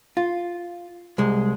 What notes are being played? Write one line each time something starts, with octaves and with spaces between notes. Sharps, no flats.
F4
C2 G#3